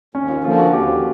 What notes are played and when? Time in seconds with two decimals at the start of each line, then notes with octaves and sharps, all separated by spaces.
0.15 D#2 C#4
0.29 F4
0.44 D3 F3 A#3 F4
0.59 F#4
0.73 D#2 G4